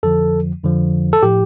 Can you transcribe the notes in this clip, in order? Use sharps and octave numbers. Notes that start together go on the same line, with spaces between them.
F2 D3 F3 A4
F2 D3 F3
A4
A2 F3 G4